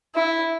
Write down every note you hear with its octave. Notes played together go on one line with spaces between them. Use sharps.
E4